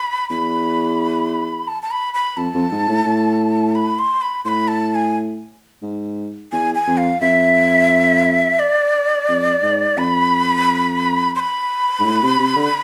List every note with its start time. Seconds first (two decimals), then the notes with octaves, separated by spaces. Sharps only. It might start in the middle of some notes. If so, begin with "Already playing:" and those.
Already playing: B5
0.30 E2 B5
1.68 A5
1.82 A5
1.91 B5
2.14 B5
2.37 F2 A5
2.54 F2
2.72 G#2
2.88 A2
3.06 A2
3.75 B5
3.99 C6
4.21 B5
4.45 A2 B5 C6
4.68 A5
4.91 A5
4.95 G#5
5.82 G#2
6.52 E2 G#5
6.75 G#5
6.87 F2
6.97 F5
7.21 F2 E5
8.59 D5
9.28 F2
9.62 G#2
9.97 F2 B5
11.35 C6
11.40 B5
12.00 G#2
12.05 A2
12.22 C3
12.39 C3
12.56 D3